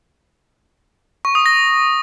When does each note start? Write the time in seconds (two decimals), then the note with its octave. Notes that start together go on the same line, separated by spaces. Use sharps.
1.25 C#6
1.35 D#6
1.46 A#6